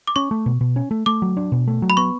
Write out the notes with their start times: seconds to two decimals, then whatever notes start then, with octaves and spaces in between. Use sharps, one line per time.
0.07 D6
0.16 C#4 C#6
0.31 A3
0.46 B2
0.61 B2
0.76 C#4
0.91 A3
1.06 A3 D6
1.22 F#3
1.37 D4
1.52 B2
1.67 A3
1.82 F#3
1.90 B5
1.97 B3 C#6